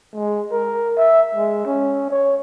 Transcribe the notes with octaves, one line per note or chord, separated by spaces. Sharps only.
G#3
A#4
E5
G#3
C#4
C#5